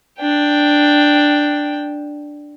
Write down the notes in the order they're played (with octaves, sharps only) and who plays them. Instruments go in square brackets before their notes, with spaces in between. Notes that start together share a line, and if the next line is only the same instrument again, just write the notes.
[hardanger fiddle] D4 G5